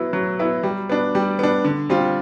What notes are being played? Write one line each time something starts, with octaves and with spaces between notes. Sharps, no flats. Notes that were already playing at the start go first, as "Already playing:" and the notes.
Already playing: F#3 B3 E4
F#3
B3 E4
G3
B3 D4
G3
B3 D4
D3
G3 C4 F4